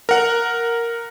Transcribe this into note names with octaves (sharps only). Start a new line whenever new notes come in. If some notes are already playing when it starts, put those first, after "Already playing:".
A#4 F#5